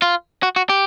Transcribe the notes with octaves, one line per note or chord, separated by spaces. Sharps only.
F4
F#4
F#4
G4